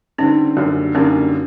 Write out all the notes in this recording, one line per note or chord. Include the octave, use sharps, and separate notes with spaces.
G2 D3 G3 C4 C#4 D#4
F#2 D3 G3 A#3
F#2 D3 G3 A#3 C#4 D#4